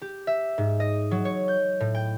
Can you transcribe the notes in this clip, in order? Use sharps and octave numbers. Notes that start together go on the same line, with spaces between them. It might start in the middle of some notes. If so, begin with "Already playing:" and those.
G4
E5
G#2
D#5
F#3
C#5
G6
A2
G5